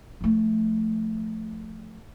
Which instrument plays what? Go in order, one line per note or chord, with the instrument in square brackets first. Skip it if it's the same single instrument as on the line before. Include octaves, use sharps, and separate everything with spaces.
[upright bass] F3 A3